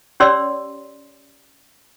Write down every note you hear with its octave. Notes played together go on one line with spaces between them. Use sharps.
C#4 G4 C#5 D5 C6 E6